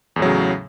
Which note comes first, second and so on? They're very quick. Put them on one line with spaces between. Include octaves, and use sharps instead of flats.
E2 A2 F#3 C#3